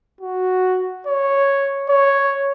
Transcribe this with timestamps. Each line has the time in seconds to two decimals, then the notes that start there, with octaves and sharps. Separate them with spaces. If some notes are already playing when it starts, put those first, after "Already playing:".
0.21 F#4
1.07 C#5
1.89 C#5